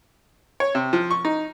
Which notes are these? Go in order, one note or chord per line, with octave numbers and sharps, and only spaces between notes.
C#5
C3
F3
C#6
D#4